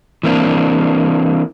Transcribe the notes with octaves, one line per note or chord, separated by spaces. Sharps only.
E3 A#3 C4 D4